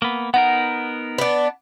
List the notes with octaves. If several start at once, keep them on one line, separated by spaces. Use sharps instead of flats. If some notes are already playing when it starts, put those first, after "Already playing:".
A#3 B3
B3 D#4 A#4 F#5
B3 D4